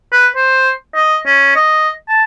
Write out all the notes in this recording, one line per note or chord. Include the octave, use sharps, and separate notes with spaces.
B4
C5
D#5
C#4
D#5
A5